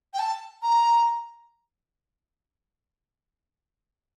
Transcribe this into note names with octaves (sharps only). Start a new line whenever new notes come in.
G5
A5
A#5